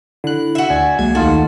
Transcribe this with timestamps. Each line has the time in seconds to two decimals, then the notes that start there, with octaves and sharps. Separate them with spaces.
0.24 D3 E4 F#6
0.55 F#4 E5
0.70 D2 D5 G#5
0.99 C2 F#3 G#3 A#3 G#6
1.15 D#2 A3 D#4 F4 F#4 A5